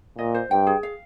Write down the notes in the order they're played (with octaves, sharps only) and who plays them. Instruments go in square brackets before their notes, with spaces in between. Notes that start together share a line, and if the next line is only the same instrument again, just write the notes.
[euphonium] A#2 [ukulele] D#5
[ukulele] C5
[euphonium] G2 [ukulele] G5
[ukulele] G#4
F5